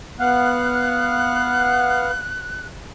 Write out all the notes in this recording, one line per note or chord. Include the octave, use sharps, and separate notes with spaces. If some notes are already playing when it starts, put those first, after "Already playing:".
B3 F5 F#5 F#6